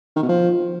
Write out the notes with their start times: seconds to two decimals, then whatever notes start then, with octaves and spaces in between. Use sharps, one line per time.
0.16 D#3
0.23 B2
0.29 F3